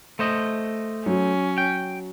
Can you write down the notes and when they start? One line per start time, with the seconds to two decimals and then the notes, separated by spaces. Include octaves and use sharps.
0.19 A3 C5 D#5
1.06 F#3 C#4
1.58 G5